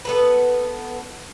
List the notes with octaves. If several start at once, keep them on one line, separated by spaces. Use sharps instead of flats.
B3 A4 B4